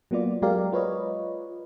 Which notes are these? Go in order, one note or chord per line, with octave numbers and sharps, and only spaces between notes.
F#3 A#3 B3 F4 D5
F#3 G#3 G4 A#4 D5 F5
F4 B4 C#5 D#5